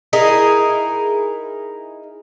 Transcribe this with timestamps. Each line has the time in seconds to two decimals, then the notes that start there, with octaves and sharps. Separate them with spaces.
0.13 D#4 E4 G#4 A#4